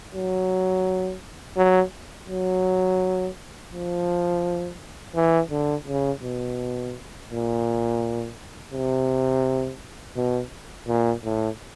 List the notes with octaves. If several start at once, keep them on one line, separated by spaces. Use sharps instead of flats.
F#3
F#3
F#3
F3
E3
D3
C#3
B2
A#2
C3
B2
A#2
A2